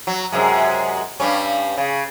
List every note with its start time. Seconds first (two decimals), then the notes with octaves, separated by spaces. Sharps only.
0.07 F#3
0.32 F#2 C3 G#3
1.20 G2 G3 C#4
1.78 C#3